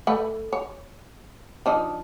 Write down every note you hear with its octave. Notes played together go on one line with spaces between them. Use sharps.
A3 B4
C#5
F3 D4 D#4